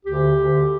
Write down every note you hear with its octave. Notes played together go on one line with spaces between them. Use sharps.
D2 D3 G4
D2 D3